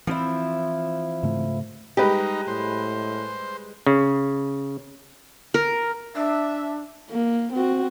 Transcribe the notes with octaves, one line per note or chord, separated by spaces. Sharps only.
E3 F3 C4 E4
G#2 C#3 A3
G3 G#3 D#4 G4 B4
A2 C5
C#3
A#4
D4 E5
A#3
C4 F#4